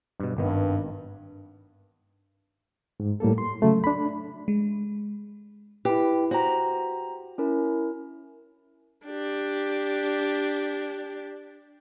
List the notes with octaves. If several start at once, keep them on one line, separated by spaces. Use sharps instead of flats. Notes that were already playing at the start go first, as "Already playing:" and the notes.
G2 B2
G#1 G2 D#3 B3
G#2
A2 G3 A#3 A4
C6
C#3 F#3 A3
D4 B5
G#3
E4 G4 B4
F#4 G4 C5 A#5
C#4 E4 A#4
D4 G4